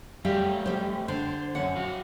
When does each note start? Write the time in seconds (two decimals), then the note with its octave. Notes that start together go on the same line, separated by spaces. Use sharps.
0.25 G3 A3 G4 F5
0.66 G3 C5
1.08 D3 C5
1.55 F#2 C#4 F#5
1.76 F#4 F5